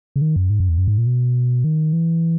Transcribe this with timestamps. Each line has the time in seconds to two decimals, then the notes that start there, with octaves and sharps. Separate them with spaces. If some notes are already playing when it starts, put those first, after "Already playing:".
0.16 C#3
0.22 D#3
0.36 F#2
0.50 G#2
0.60 F#2
0.69 E2
0.78 F#2
0.88 G#2
0.98 A#2
1.07 B2
1.64 D#3
1.93 E3